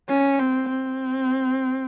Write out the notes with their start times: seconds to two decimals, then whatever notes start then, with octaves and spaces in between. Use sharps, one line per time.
0.09 C#4
0.39 C4
0.69 C4